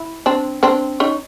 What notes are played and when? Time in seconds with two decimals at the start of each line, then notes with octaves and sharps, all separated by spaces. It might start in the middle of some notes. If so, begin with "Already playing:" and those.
Already playing: E4
0.26 C4 D4
0.63 C4 D4
1.00 C#4 D#4